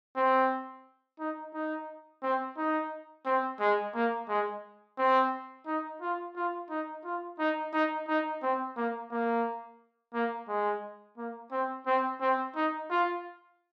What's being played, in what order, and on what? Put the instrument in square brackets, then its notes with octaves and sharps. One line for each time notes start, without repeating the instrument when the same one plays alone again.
[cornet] C4
D#4
D#4
C4
D#4
C4
G#3
A#3
G#3
C4
D#4
F4
F4
D#4
F4
D#4
D#4
D#4
C4
A#3
A#3
A#3
G#3
A#3
C4
C4
C4
D#4
F4